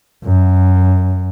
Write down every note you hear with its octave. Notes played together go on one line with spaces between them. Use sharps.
F#2